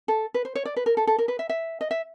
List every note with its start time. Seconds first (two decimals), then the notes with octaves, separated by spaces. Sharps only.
0.08 A4
0.34 B4
0.45 C5
0.55 C#5
0.65 D5
0.76 B4
0.86 A#4
0.97 A4
1.07 A4
1.18 A#4
1.28 B4
1.39 E5
1.49 E5
1.81 D#5
1.91 E5